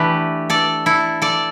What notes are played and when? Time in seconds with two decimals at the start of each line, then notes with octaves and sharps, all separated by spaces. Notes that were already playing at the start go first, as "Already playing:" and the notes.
Already playing: E3 A3 D4 G4 B4
0.50 A4 D5
0.86 E4 A4
1.22 A4 D5